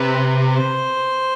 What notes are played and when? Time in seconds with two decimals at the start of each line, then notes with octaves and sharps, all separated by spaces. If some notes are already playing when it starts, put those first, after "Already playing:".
Already playing: C3 B4
0.52 C5